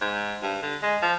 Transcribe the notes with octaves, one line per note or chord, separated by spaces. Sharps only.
G#2
G2
D3
G#3
F3